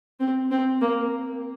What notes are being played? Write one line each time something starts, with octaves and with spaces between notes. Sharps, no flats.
C4
C4
A#3